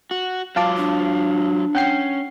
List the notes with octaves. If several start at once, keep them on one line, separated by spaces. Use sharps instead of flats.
F#4
F#3 F4 F5 A5 D6
D4
C#4 F#5 G5 C7